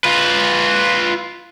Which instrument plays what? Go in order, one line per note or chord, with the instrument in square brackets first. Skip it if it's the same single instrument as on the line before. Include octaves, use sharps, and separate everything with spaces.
[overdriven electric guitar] F4 B4